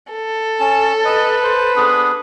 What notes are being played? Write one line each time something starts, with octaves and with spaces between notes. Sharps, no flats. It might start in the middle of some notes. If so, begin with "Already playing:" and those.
A4
C#4 A5
B4 D#5
C5
B3 D4 G#4